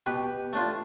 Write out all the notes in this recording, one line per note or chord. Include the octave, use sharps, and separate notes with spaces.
B2 G4 B4
A3 D4 F4